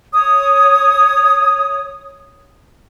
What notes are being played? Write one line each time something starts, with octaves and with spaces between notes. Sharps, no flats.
C#5 D#6